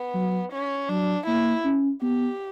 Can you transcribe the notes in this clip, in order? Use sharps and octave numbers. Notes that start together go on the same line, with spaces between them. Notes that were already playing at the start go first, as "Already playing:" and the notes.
Already playing: B3
F#3
C#4
F#3 D4
A#3 E4
C#4
B3 G4